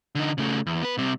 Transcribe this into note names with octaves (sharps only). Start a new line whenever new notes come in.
D3 D#4
C#3 A3
E2
B3 B4
C2 C3